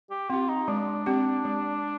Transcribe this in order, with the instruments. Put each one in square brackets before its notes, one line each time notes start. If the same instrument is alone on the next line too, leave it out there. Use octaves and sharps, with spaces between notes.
[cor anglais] G4
[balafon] C4 G4 [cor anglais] F4
[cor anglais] D#4
[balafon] G#3 [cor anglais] D4
[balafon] C4 G4
G#3